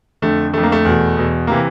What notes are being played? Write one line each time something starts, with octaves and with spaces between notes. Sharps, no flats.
F2 D3 A3
F2 D3 A3
A#3
A3
E2 B2
E2 B2
C3 E3 A#3